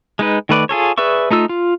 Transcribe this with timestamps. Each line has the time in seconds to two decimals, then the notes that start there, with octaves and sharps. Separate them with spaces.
0.19 G#3 D#4 B4
0.49 D#3 A3 B4 D5
0.69 F4 G#4 A4 C#5
0.98 G#4 B4 D5 E5 C#6
1.31 A3 D#4 F4 E6
1.49 F4